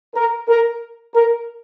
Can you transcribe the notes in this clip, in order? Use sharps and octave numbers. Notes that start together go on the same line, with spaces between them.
A#4
A#4
A#4